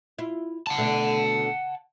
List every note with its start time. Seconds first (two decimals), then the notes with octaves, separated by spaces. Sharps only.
0.19 E4 F4
0.67 F#5 A5
0.78 B2 D3 A3